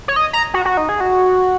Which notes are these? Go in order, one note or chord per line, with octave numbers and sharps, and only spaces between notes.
C#5
D#5
A#5
F#4
F#4
D#4
G#4
F#4